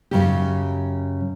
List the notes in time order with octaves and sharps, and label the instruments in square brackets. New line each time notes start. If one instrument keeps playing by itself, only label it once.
[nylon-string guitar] F#2 C#3 G4